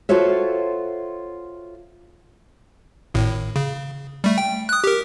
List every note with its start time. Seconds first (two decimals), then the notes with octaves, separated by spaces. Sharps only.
0.09 F4 F#4 A4 C5 C#5 E5
3.14 G#1 A2
3.56 C#3
4.24 G3 A3
4.38 G5
4.69 D#6 F#6
4.84 G4 A#4